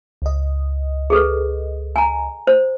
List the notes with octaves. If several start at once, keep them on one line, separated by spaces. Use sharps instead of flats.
C#2 D#5
G#4 A4 B4
G#5 A#5
C5